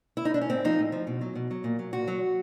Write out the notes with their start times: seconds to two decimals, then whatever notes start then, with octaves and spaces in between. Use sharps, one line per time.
0.17 E4
0.25 D#4
0.34 D4
0.41 C#4
0.50 A2 C4
0.64 F3 D#4
0.79 A2
0.92 F3
1.07 B2
1.21 F#3
1.36 B2
1.51 F#3
1.64 A#2
1.79 F#3
1.93 A#2 F#4
2.08 F#3